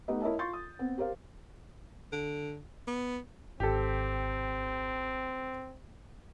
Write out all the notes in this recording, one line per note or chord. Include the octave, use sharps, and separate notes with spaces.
A3 B3 D#4 G4 B4 D#5
E4 A#4 C#5 D#5 E5 A5
F4 C6 C#6 G6 A6
D#6
B3 C4
G4 A#4 C5 F5
D3
B3
G#1 C4 G4 A4